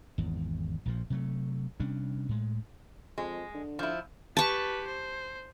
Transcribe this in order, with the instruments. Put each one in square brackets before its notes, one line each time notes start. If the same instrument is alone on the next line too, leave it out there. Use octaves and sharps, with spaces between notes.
[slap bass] G#1 E2
A#1 A#2 F3
C3 F#3 A3
C3 G3 C#4 D4
A2 G#3
[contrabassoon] F2 [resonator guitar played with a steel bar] G#3
[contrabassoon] D3
[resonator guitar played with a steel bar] F3 E4
[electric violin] G4 B4 [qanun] A5 C#6
[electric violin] C5